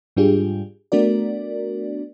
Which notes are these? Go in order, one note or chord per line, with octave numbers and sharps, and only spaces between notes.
G#2 G3 D4 F4 G4 G#4
A3 B3 D4 F#4 A#4 D5